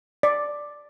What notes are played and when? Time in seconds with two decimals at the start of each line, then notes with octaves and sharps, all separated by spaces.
0.23 D5